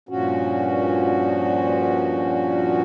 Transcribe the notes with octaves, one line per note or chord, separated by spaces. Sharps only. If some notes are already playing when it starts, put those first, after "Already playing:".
G2 A#2 F3 C#4 F#4